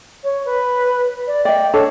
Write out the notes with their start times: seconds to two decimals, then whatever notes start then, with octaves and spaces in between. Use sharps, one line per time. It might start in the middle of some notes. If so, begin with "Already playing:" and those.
0.24 C#5
0.46 B4
1.27 D5
1.45 D5 D#5 G5
1.73 D4 A4 C#5